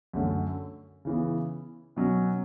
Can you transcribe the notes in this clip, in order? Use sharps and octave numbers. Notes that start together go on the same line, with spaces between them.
F#2 D3 A3
C#3 E3 B3
B2 F#3 C#4